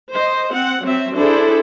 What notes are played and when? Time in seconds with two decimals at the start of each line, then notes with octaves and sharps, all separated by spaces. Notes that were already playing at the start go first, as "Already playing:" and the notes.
0.13 C5 D#5
0.53 C4 F#5
0.84 F#3 C4 E5
1.16 D4 E4 G#4 A4 C5